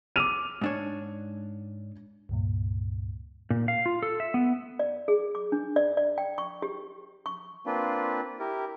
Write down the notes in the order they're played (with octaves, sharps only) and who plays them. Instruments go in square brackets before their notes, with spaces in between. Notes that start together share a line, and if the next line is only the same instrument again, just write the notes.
[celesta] D6 E6 F6 [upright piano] D#7 F7
[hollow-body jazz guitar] G#2 D4 C#5
[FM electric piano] C#2 G2 A#2
[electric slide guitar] A#2
F5
F4
A4
E5
B3
[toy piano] D5
G#4
D6
D4
D5
D5
G5
C#6
G4
C#6
[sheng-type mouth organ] A#3 C4 D4 F4 B4
E4 G4 A#4